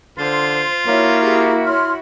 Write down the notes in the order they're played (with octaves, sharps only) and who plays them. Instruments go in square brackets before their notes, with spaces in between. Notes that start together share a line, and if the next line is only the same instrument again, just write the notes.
[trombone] D3 [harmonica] F4 [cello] C5
[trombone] A#3 [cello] E4 F#4 [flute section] C#5
[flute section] G4 G#4 A#5
C#5 C6 F6